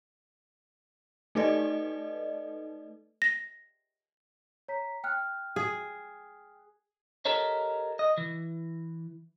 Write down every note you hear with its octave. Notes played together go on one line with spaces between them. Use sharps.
A3 D#4 A4 B4 D5 D#5
A#6
C#5 A#5 B6
G5 F6 F#6
G#4
G4 A4 A#4 C#5 D#5
D#5
E3